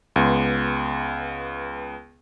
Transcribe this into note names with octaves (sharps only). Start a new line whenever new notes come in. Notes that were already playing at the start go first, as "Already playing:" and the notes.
C#2 B3 C6